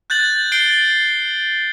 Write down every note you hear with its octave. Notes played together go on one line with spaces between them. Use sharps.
F#6 G6 A6 F#7
G6 C7 D7 G7